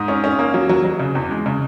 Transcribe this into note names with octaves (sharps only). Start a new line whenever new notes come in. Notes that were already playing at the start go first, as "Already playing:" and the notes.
Already playing: G#2 D#6
C#4
C#4
A#3
F#3
F#3
F#3
C#3
E2
G#3
C#3